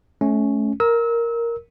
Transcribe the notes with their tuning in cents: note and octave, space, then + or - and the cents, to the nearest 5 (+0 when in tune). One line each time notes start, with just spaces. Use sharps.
A3 -30 C#4 +0
A#4 +0 E6 -30